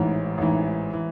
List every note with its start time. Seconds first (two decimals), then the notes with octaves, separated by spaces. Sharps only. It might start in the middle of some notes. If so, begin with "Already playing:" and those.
Already playing: A1 G#2 E3
0.38 A1 G#2 E3
0.94 E3